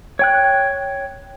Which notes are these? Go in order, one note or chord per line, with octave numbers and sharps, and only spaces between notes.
C#5 G5 F#6